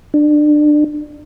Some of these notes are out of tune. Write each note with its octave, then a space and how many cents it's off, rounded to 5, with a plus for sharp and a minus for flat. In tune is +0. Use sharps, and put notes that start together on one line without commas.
D4 +25